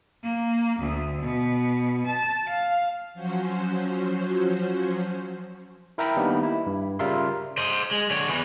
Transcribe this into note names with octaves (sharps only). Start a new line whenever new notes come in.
A#3
D2
B2
A5
F5
F3 F#3 C#4 F#4 C5
E4 A#4 E5 G5 A#5 B5
D#3 G3 A#3 B3 D4 D#4
E4
G2
C#3 G3 F4 A#4 E5 C6
C5 D#5
G#3
D3 C#5
E2 E3